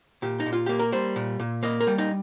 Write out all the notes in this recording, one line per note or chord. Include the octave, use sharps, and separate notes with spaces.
A#2 G4
D#4
A#2
F4
A#3 G4
A#4
G3 C5
A#2
A#2
A#3 D#5
A#4
G3
D#4